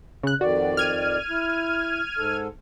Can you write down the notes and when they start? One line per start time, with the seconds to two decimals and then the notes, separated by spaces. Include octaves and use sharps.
0.23 C#3 F#6
0.41 F2 D#3 F#4 D5
0.77 F6 G#6 D#7
1.30 E4
2.18 G#2 A4